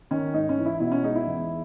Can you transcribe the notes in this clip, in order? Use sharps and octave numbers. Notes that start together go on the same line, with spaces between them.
D#3 C#4
G#2 D#4
C#4
E3
E4
B2 E4
C#4
G#3 D#4
E4
E2